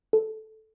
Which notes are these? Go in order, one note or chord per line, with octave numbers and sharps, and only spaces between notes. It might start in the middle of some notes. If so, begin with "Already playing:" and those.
A4